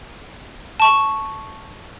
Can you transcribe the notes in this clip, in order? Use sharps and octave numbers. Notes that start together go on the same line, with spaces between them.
A5 C#6